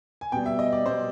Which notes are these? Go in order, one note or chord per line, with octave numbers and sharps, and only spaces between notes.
G#5
B2 G3 G5
E5
D#5
D5
B2 G3 C5